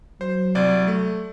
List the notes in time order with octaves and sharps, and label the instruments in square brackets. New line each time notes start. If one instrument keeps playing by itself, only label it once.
[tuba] F#3 [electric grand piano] C5
[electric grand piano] C2 D5
A3